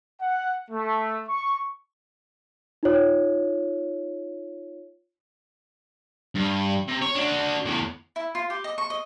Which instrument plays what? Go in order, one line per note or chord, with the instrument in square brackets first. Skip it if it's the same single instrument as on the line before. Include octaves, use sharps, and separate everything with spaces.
[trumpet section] F#5
A3
C#6
[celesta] D#4 F4 C#5
[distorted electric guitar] G2
C3
C#5
D4 F#4
E2 A2
[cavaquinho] E4
F4
G4
D#5
C#6
D#5